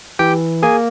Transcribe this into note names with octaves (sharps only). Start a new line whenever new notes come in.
E3 G4 G5
A#3 G#4 G#5